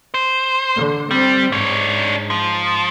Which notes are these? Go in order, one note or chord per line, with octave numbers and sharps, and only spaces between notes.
C5
D3
G3 C4
G#2 D4 C#5
F3